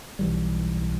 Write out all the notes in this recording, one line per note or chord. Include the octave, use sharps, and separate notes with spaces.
B1 E3 G3